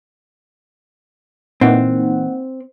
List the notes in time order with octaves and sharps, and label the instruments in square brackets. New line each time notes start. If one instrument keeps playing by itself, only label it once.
[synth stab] A#2 E3 [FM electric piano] A#3 D#4 F#5 [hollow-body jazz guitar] C4